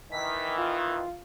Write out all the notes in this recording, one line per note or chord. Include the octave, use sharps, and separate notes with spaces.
D#3 E3 B6
F4